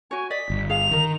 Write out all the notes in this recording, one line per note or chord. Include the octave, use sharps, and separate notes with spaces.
F#4 C#5 G#5
D5 D#5 B6
G1
G#4 F5 F7
D#3 D#4 A#4